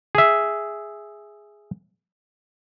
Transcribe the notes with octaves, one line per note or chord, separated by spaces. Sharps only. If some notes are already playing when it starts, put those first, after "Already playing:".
G#4 E5